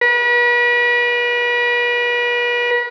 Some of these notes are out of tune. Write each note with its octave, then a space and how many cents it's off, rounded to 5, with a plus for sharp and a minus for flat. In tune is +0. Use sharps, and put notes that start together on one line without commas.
B4 -40